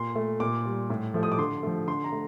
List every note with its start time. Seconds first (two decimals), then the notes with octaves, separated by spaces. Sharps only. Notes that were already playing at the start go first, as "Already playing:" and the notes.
Already playing: A#2 C6
0.16 A3
0.40 A#2 D6
0.65 G3
0.90 A2
1.14 F3 A3
1.23 D#6
1.32 D6
1.38 D3 C6
1.63 F3 A3
1.88 D3 C6
2.04 A#5
2.12 A3